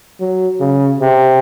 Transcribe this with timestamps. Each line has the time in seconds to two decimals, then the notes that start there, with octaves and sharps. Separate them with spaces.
0.20 F#3
0.60 C#3
1.01 C3